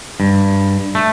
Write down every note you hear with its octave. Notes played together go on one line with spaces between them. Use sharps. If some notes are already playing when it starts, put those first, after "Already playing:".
G2
A3